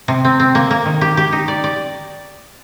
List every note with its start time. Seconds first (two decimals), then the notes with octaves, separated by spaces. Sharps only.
0.08 C3
0.25 C4
0.40 C4
0.55 A#3
0.71 A#3
0.86 D#3
1.01 G4
1.17 G4
1.32 D#4
1.48 D5
1.64 D5